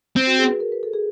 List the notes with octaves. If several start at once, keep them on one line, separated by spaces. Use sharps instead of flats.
C4
F#4
G#4
B4
A#4
B4
A4
G#4